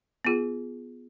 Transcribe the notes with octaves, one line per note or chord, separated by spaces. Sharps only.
B3 F4 G#4